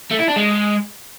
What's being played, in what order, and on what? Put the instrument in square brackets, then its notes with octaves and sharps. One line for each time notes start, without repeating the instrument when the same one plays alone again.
[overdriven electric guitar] A3
E4
D4
G#3